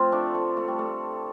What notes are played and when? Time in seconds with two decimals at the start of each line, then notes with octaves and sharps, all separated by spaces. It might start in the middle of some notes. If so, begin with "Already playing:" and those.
Already playing: A2 F3 C4 F4
0.12 A3 D4
0.35 A3
0.57 A3
0.68 G3
0.79 A3